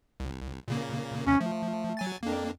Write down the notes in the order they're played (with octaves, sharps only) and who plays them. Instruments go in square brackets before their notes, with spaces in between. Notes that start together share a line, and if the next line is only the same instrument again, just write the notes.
[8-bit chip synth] C2
A#2 C#3 A#3
[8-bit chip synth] D#2 C3 [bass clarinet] C#4
[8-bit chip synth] F3 [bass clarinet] A3
[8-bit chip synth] F#3 G#5 A6
[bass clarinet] F2 [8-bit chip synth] A#3 D4